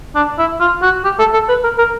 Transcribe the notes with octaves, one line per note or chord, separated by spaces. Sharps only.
D4
E4
F4
F#4
G4
A4
A4
B4
A#4
A#4